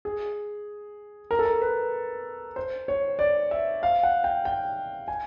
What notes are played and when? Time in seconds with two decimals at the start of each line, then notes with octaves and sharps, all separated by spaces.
0.05 G#4
1.31 A#4
1.39 A4
1.45 A#4
1.61 B4
2.56 C5
2.88 C#5
3.19 D5
3.51 E5
3.83 F5
4.03 F#5
4.24 G5
4.45 G5
5.08 G#5